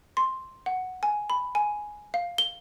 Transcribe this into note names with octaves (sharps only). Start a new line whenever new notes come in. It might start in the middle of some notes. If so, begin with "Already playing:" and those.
C6
F#5
G#5
B5
G#5
F5
G7